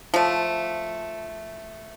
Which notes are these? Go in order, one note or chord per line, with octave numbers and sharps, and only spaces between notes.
F3 A3